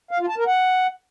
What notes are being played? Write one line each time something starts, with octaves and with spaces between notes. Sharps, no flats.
F5
F4
A5
A#4
F#5